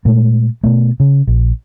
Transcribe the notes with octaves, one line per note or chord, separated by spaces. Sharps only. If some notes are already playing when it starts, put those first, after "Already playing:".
A#2 G#3 A3
B2 A3
C#3
A#1